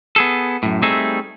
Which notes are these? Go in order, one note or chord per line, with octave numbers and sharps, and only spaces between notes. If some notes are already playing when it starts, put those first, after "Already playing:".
B3 G#4 A4
F#2 A2
G3 A3 C4 D#4 G#4 E5